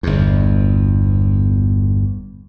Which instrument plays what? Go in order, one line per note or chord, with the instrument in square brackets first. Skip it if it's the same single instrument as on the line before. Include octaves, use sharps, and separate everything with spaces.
[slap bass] G1 E2